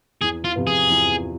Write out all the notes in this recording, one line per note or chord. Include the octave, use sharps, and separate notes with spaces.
E2 G#4
F4
C3 F3 B3 F4
G#4
E2